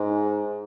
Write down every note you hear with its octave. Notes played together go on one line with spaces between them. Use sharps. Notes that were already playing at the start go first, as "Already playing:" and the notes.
Already playing: G#2